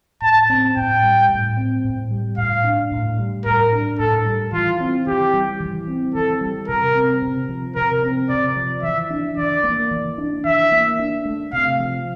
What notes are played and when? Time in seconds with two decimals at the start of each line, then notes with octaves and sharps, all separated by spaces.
0.22 A2 A5
0.50 C4
0.76 A2 G5
1.03 G3
1.29 A2
1.57 C4
1.84 A2
2.11 G3
2.38 A2 F5
2.64 D4
2.91 A2
3.18 G3
3.45 A2 A#4
3.72 D4
3.99 A2 A4
4.25 G3
4.52 E3 F4
4.80 C4
5.07 E3 G4
5.34 G3
5.60 E3
5.87 C4
6.14 E3 A4
6.41 G3
6.68 C3 A#4
6.95 C4
7.22 C3
7.49 F3
7.75 C3 A#4
8.03 C4
8.29 C3 D5
8.56 F3
8.83 E3 E5
9.10 D4
9.37 E3 D5
9.64 A#3
9.91 E3
10.18 D4
10.44 E3 E5
10.72 A#3
10.99 D4
11.25 A3
11.53 C3 F5
11.79 F3